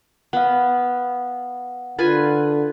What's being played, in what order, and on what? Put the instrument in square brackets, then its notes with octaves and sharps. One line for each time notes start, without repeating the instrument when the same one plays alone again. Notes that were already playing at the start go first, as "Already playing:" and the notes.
[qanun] B3 [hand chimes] F5 F#5
[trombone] D3 [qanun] F4 B4 G#5